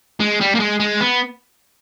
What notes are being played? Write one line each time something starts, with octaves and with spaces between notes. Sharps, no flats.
G#3
G3
A#3
G#3
G#3
B3